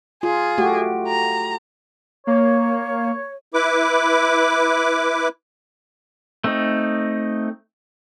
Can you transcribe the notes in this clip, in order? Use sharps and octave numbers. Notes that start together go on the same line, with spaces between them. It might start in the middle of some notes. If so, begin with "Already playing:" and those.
F4 G#4
A3 F#4 G4
A#5
A#3 C#5
E4 B4 D6
A3 C4 D#4